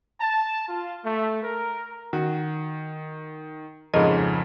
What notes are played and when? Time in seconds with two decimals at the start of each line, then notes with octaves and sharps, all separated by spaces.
0.20 A5
0.68 F4
1.05 A3
1.43 A#4
2.13 D#3 F#4
3.94 F2 G#2 C#3 G#4 A#4 D#5